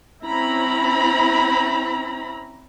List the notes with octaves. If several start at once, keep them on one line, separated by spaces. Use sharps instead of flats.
C4 C#4 E4 A#5 B5